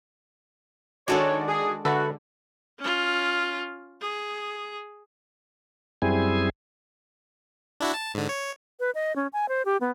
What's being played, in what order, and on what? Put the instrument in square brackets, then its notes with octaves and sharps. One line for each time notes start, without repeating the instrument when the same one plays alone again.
[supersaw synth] D#3 F#4 D5 [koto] G#3 D4 A4 [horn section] C#5
[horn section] G#4
[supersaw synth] D3 [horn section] F#4 [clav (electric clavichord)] A4 B4 E5
[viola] C#4 F4
G#4
[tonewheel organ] F#2 G3 C4 E4 G#4 G#5
[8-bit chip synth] D4 E4 F#4
A5
G#2 D3
C#5
[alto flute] B4
D#5
C#4
G#5
C5
G4
B3